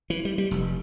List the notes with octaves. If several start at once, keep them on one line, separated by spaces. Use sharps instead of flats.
E3
G3
G3
F1